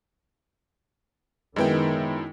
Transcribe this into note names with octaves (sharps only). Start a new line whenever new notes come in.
F#2 D#3 G#3 B3 E4 G5